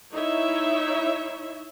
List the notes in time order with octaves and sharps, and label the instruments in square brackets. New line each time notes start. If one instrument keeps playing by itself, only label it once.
[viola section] D#4 E4 C#5 E5